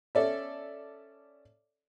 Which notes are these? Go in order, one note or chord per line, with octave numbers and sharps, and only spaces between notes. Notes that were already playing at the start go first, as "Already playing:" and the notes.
C#4 A4 D5 E5